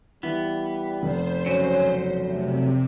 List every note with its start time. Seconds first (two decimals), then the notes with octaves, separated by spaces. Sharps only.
0.23 E3 G3 B3
1.03 F1 C5
1.46 C#3 F#3 C#4
2.27 C3 A3